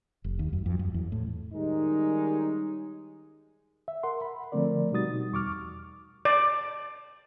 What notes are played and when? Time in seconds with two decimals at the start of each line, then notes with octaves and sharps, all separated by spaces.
0.24 F1
0.39 D#2
0.53 F#2
0.66 F2
0.79 F#2
0.94 E2
1.12 A2
1.53 D#3 G3 G#3 C#4 D#4
3.88 E5
4.03 A#4 F#5 C6
4.22 B5
4.52 D3 F3 A3 C4 A#4 D5
4.91 B2 G3 D#4 F#4 D#6 A6
5.32 E2 C#6 D6 F6
6.25 D5